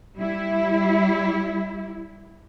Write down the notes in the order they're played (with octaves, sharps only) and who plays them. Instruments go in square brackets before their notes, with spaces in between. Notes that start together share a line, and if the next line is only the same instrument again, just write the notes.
[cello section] G3 E4